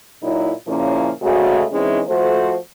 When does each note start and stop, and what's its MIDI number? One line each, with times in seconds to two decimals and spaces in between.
0.22 0.51 46
0.22 0.51 54
0.22 0.51 63
0.22 0.51 64
0.67 1.09 46
0.67 1.09 49
0.67 1.09 53
0.67 1.09 58
0.67 1.09 61
0.67 1.09 64
1.22 1.64 38
1.22 1.64 49
1.22 1.64 56
1.22 1.64 57
1.22 1.64 66
1.71 2.00 52
1.71 2.00 56
1.71 2.00 60
1.71 2.00 61
1.71 2.00 63
1.71 2.00 64
2.07 2.56 53
2.07 2.56 57
2.07 2.56 66
2.07 2.56 69
2.07 2.56 72